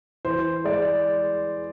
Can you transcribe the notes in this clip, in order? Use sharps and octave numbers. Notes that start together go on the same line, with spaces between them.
E3 C5
G#3 D5